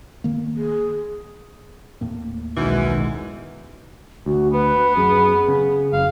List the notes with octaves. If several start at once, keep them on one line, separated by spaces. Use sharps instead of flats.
D#3 A#3
G#4
D#2 A2 A#3
B1 F#2 D#3 E3 G#3
D2 F#4
B3 B4
F#2 G#4
C#3
F#1 F5